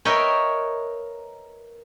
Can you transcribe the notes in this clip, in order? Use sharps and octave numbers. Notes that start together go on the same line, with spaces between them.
A#4 B4 C#5 D#5 E5 G5